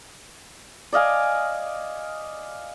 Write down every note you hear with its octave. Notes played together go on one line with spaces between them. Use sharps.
D5 D#5 F5 G#5